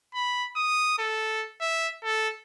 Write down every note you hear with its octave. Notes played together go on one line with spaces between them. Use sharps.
B5
D#6
A4
E5
A4